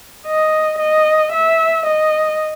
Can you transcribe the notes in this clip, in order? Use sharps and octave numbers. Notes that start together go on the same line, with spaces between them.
D#5
D#5
E5
D#5